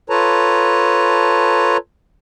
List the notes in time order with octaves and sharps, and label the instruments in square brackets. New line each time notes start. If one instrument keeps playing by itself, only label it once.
[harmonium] F4 A4 B4 C#5 A5 A#5